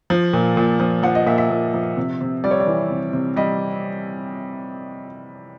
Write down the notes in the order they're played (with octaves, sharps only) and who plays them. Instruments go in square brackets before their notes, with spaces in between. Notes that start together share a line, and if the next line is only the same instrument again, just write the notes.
[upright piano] F3
A#2
A#2
F3
F3 F#5
D#5
A#2 E5
E5
A#2
F3
C3
C3
G3 D5
C#5
D5
E3
C3
C3
G3 D#5